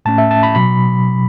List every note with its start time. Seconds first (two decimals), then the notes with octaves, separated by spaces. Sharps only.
0.05 A2 A3 C#4 A5
0.18 E5
0.31 A5
0.43 B5
0.55 B2 F#3 B5